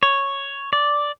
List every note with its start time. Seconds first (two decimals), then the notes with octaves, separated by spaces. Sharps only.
0.03 C#5
0.73 D5